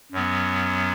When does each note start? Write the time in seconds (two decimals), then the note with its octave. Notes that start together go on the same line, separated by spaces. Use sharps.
0.12 F#2 F#3 B3